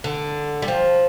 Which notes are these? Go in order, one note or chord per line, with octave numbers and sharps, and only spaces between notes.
D3
G3
F3